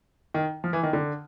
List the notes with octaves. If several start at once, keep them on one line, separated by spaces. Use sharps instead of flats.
D#3
F3
E3
D#3
D3